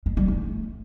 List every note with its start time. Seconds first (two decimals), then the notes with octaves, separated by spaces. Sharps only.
0.06 G#3
0.17 G3
0.28 A3